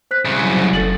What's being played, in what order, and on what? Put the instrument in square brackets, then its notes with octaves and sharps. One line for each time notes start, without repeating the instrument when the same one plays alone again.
[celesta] C5 F#6 B6
[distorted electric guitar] C2 C#3
[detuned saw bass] F#3
[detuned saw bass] F#1 [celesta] A4 A6 F#7